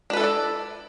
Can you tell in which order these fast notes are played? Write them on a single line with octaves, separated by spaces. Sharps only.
D4 B4 A4 E4 D5